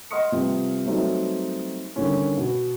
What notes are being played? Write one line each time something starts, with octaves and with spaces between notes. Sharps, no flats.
D#5 F#5 C6 D#6 F6 C#7
C3 F3 G3 B3
F#3 G3 A3 B3 C4 D#4
D3 D#3 G3 C#4
B2